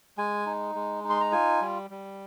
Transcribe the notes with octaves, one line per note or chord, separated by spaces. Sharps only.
G#3 G#5
D#4
G#3
D#4
C6
A#5
F4 G#5
G3
G3